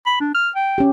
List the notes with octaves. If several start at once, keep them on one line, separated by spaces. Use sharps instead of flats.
B5
D4
F6
G5
C#4 G4